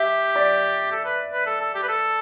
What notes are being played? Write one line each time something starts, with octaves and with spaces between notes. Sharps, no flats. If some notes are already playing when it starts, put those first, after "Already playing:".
Already playing: G4 E5
D5
A4
B4
B4
A4
A4
G4
B4
A4